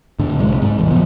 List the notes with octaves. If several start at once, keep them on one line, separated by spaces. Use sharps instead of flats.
A2 D3
C2 C3 D#3 G#3
G#2
E1 A1
A#2 D#3 F3 B3